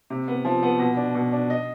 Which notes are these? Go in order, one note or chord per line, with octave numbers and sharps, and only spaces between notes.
C3
B3
F3
B3
B2
D4
B2
D4
D#5